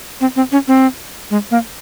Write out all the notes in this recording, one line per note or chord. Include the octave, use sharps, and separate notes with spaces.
C4
C4
C#4
C4
G#3
A#3